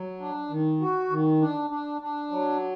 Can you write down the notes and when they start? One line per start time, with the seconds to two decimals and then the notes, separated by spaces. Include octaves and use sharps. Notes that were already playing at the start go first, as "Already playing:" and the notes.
Already playing: F#3
0.20 D4
0.50 D#3
0.81 F#4
1.10 D#3
1.41 D4
1.70 D4
2.01 D4
2.31 F#3